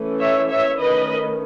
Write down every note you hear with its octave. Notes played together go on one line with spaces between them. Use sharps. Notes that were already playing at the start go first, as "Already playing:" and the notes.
Already playing: E3 A3 C#4
C#5 E5
C#5 E5
D#3 A3 C#4 B4 D#5